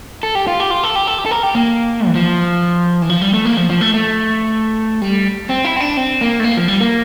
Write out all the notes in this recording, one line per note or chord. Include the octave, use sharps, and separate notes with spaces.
A4
G4
F4
G4
F4
A4
G4
A4
G4
A4
A#4
G4
A#3
E3
F3
E3
F3
G3
A3
A#3
F3
F3
A3
A3
G3
C4
E4
C4
D4
C4
A#3
A3
A#3
F3
G3
A#3